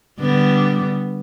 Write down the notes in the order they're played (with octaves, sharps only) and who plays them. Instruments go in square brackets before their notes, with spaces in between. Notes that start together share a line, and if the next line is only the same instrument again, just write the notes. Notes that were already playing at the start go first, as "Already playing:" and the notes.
[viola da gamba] D3 G3 B3